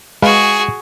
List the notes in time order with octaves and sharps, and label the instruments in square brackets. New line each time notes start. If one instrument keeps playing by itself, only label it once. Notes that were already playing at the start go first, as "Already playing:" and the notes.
[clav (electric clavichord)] G#3 B4 F5 [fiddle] F#4 G#4